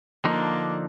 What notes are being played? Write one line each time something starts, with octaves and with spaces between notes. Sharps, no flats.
D3 F3 A#3 D4 D#4